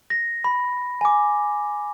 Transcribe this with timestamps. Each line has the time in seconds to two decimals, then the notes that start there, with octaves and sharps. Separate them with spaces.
0.10 A#6
0.44 B5
1.01 G#5 D6